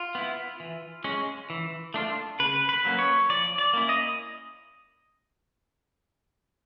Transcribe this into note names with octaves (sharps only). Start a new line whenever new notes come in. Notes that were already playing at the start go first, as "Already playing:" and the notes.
Already playing: F4
B3 E4
E3
G#3 C#4
E3
A3 D4 F4
C#3 B4
B4
F#3 A#3 C#4
C#5
F3 D5
D5
A#3 C#4 E4
D#5